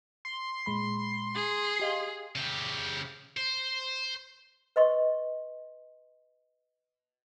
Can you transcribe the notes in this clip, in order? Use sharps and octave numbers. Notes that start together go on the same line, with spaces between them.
C6
A#2 G#3 B5
G#4
G4 D#5 F5
C#3 G4
C5
B4 D#5 C6 C#6